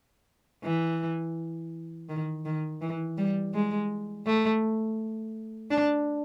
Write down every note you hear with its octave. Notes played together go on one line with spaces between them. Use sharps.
E3
D#3
D#3
E3
G3
G#3
A3
D4